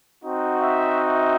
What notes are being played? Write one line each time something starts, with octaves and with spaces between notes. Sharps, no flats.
C4 D#4 F#4
E5
E5